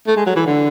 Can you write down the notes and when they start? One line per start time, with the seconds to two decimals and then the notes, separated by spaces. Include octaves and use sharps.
0.07 A3
0.17 G#3
0.26 F#3
0.36 E3
0.46 D3